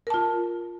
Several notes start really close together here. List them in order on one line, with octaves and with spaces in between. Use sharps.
A#4 A5 F4